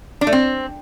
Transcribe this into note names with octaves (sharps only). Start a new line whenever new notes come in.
D4
A3
C4